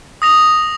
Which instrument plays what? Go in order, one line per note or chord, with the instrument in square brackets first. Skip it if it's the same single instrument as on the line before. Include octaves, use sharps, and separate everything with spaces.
[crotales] D#6 A#6 F7